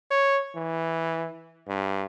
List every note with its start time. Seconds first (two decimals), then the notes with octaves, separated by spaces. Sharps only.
0.11 C#5
0.55 E3
1.68 G2